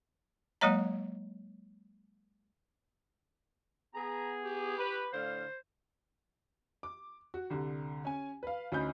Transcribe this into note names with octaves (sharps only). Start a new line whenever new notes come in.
F#3 G#3 A#3 C#5 D#5 A#5
B3 G#4 A#5
G4
B4
A2 D3 C5 F5
D6
F#4
C2 D3
C#4 G#5
B4 F5
D2 C#4 D#4 B5 G6